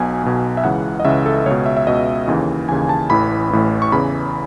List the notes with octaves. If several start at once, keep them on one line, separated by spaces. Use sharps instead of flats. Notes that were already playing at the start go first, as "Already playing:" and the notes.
Already playing: B1 B2 G#5
B1 B2
E5
C#2 C#3 E3 F#5
D#5
C#2 C#3 E3 E5
A4
C#2 B2 C#5
E5
E5
C#2 B2 D#5
D#2 C#3 E3
D#2 C#3 E3 G#5
A5
A1 A2 E3 B5
A1 A2 E3
C#6
E2 C#3 E3 B5